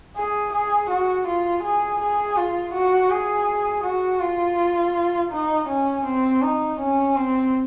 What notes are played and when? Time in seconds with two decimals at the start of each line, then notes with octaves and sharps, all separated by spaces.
0.16 G#4
0.53 G#4
0.90 F#4
1.27 F4
1.63 G#4
2.00 G#4
2.37 F4
2.74 F#4
3.10 G#4
3.84 F#4
4.20 F4
5.31 D#4
5.68 C#4
6.06 C4
6.42 D#4
6.79 C#4
7.16 C4